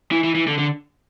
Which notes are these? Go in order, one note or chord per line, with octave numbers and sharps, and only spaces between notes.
E3
E3
E3
D3
D3